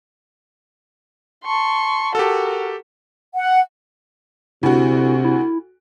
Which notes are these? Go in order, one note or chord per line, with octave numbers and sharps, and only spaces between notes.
A5 C6 C#6
F#4 G4 A4 A#4
F#5
D2 C3 E4 F#4
E4